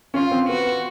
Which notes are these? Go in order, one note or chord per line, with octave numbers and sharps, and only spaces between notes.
C#4 F4
C4
B3 F#4